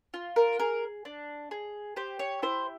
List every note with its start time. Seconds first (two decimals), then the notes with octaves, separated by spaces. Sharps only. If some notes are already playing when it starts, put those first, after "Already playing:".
0.14 F4
0.36 A#4
0.59 G#4 A#4
1.05 D4
1.51 G#4
1.96 G4 C5
2.19 C#5
2.42 E4 C5